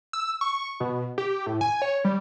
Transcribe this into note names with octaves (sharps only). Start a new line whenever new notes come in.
E6
C#6
B2
G4
A2
G#5
C#5
G3